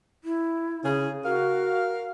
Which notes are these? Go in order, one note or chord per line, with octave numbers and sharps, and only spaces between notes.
E4
C#3 G#4
F#4 A#4 F5